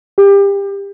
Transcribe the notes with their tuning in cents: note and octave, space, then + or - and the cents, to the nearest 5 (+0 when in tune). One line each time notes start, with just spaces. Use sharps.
G4 +25